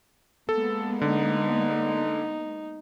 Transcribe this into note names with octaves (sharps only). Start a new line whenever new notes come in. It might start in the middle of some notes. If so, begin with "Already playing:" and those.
G#3 A#3 B3 A4
D3 D#4